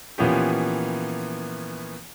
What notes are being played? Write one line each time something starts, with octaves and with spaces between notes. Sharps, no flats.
A#2 E3 F3 B3 C#4 G4